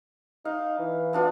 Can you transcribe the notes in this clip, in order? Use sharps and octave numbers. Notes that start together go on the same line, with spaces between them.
D#4 F5
E3
B3 D4 F4